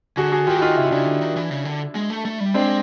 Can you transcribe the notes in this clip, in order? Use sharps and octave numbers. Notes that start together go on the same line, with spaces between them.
D3 F#4 G#4
F#4 G#4
D#3 F4 G4
F#4
D#4 F4
C#3 E4
F4
C#3 D4 E4
D3
D#3
E3
C#3
D3
G#3
A3
A3
G3
G#3 C4 D4